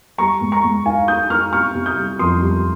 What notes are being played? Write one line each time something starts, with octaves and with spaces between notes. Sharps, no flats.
G3 A#5 C#6
G#2
A#5 C#6
G#2
D#4 F5 G#5
D#4 D#6 G6
D#4 C#6 F6
C3 C#6 F6
C3
D#6 G6
G3
F2 C6 D#6
G3